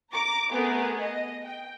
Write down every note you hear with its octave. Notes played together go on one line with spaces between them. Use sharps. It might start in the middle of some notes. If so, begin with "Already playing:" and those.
A#5 D6
A3 B3 G#4 A#4
D#5
G5